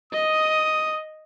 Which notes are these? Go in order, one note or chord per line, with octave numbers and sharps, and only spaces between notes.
D#5 D#6